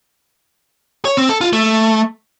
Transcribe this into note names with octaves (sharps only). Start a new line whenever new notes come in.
C#5
C4
A4
F4
A3